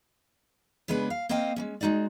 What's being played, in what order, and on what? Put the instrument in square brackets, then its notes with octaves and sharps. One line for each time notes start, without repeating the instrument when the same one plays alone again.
[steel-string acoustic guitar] C#3 G#3 B3 D4 B4
F5
A#3 C4 C5 D#5 F5 G5
G#3 A#3 C#4
G#3 A3 D#4 F#4 D5